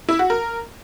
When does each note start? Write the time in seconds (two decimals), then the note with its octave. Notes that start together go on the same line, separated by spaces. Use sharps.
0.09 E4
0.19 F#4
0.30 A#4